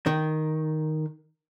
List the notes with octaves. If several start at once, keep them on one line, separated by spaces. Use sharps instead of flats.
D#3